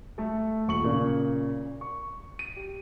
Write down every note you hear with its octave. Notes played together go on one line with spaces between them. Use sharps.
A3 A4
D#1 C#6 F#7
A#2 C#3
C#6
D#7
G4